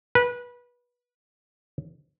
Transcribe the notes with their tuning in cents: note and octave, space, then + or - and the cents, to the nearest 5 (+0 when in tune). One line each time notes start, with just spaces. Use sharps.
B4 -25